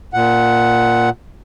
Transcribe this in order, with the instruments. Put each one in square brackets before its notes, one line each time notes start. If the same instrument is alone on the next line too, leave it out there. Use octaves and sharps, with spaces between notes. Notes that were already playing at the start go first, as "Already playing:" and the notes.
[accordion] A#2 F#5